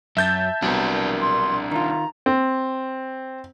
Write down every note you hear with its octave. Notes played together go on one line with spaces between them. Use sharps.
F#2 E5 A5 G6 A6
C2 F#3 B3 D4 A#4
C6
D#3 F4 A#5
C4